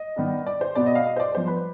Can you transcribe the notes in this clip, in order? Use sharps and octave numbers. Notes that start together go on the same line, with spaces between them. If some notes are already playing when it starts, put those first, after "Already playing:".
Already playing: D#5
D#3 B3 D4
D5
C5
B2 B3 D4 D5
D#5
F5
D#5
C5
D5
F3 B3 D4 C5
B4